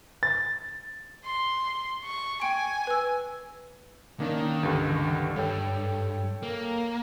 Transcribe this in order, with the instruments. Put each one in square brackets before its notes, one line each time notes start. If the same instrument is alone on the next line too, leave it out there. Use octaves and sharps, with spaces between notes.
[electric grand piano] A6
[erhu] C6
C#6
[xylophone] G5 C#6 D7 [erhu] G#5
[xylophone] B4 E6
[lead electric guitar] D#3 [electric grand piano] A#3 C#4 D4
[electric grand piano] C#2 G2 D3
[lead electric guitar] G2 [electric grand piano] A4 C#5 G5
[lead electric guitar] A#3